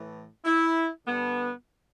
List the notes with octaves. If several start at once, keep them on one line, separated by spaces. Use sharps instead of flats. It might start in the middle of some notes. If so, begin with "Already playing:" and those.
Already playing: A2 E3
E4
G2 D3 B3